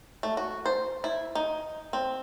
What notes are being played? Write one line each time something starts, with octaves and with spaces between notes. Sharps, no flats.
A3
F#4
C5
E4
D#4
C4